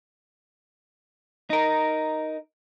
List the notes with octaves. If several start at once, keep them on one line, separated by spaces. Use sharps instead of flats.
D#4 A#4